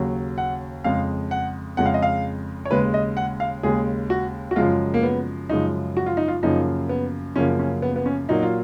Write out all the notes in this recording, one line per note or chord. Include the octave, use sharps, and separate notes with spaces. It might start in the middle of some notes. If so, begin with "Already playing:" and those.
Already playing: D#2 C#3 F#3
F#5
F2 C#3 G#3 F5
F#5
F2 C#3 G#3 F#5
F5
D#5
F5
C#5
D#2 C#3 G#3 B4
D#5
F#5
F5
D#2 C#3 G#3 G#4
F#4
F#4
F#2 C#3 F3 G#3 F4
A#3
B3
F#2 C#3 F3 G#3 D#4
F#4
F4
D#4
F4
F#2 C#3 F3 A#3 D#4
B3
F#2 C#3 F3 A#3 C#4
C#4
B3
B3
C#4
A#2 F#3 A#3 D#4
F4